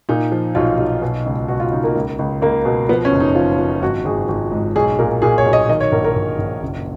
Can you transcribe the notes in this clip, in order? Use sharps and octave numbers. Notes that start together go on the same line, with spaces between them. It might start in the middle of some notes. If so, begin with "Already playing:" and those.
A#2 D#4
F3
B1 F4
B1
B2
C#2
B2 F#4
F4
C#2 D#4
A#3
C#2
C#2
C#2 A#3
B2
F3 B3
C#4
F#1
D#4
F3 F4
F3
G#1 F#4
G#1 G#4
G#1
G#2
B1 G#4
A#2 A#4
A#2 G#4
C#5
B1
D#5
D#3 D#5
C#5
A#1 A#4
A#4
A#1
A#1
F#1